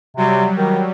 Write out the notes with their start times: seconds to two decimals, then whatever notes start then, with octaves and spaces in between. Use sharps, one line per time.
0.17 C3 F#3 G3
0.58 D#3